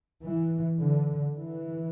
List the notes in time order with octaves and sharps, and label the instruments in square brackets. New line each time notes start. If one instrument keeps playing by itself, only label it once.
[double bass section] E3
D3
E3